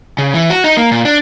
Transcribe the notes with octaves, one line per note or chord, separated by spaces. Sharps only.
C#3
E3
F#4
D#4
A#3
A#2
D4